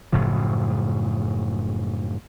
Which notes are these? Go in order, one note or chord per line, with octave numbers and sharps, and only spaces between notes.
F#1 A2 C#3 F3